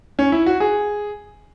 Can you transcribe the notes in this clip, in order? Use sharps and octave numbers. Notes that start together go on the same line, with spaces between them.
C#4
E4
F#4
G#4